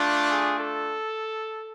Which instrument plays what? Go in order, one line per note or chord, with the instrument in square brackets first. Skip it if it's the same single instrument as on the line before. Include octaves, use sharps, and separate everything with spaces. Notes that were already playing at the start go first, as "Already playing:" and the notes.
Already playing: [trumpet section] A3 D4 F4
G#4
A4